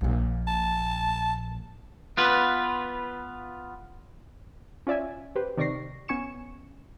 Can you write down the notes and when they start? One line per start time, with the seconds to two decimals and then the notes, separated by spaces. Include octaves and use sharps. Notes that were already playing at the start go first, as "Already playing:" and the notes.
0.01 A#1 A#2
0.48 A5
2.17 B3 F4 B4
4.87 C#4 F4 D5 E5 G#5
5.36 G4 B4 C5
5.57 C3 D#3 D5 C#6 A#6 C7
6.08 B3 C#4 G#5 C#6 C#7 E7